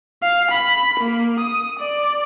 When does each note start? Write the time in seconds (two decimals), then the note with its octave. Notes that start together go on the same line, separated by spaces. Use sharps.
0.23 F5
0.51 B5
1.00 A#3
1.39 D#6
1.79 D5